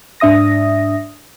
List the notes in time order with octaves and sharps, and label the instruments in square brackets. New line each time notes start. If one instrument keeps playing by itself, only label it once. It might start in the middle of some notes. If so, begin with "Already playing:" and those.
[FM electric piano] G#2 D4 E5 D#6 A#6